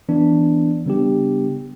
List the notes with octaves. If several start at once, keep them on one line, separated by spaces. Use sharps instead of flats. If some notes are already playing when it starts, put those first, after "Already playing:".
E3 B3 D4
C#3 G3 B3 D4 G4